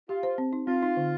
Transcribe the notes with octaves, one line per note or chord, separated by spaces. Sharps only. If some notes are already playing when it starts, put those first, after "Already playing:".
F4 G4
C5
C4
D#4
C4 F4
D#4
D3